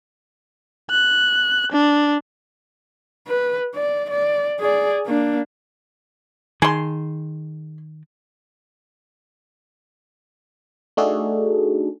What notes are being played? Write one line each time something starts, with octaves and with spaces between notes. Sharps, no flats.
F#6
D4
B4
D5
D5
G#4 D5
A#3 D4
D#3 G#4 C6
A3 D4 D#4 F#4 G#4 A4